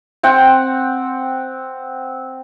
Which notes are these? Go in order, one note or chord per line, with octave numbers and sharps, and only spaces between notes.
C4 F#5 G5